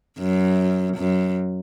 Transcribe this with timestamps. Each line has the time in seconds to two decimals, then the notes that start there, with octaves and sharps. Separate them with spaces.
0.19 F#2
0.98 F#2